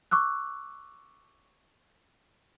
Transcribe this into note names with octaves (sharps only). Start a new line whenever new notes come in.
C#6 D6 E6 F#6